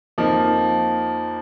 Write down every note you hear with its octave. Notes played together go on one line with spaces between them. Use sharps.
F2 F3 A#3 D#4